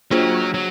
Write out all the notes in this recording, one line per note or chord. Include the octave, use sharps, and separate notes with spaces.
F#3 A#3 D4 F4 G#4 C5
F#3